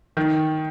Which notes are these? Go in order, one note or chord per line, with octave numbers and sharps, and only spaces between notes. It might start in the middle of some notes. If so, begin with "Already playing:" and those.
D#3